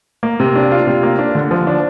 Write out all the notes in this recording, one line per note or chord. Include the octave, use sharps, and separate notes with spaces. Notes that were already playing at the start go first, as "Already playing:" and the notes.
A#3
C3
D4
F4
C3
A#3
D4
D3
F3
D4